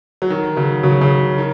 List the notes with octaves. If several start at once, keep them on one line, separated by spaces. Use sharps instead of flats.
F#3
D#3
C#3 F#3
C#3 F#3
C#3
D#3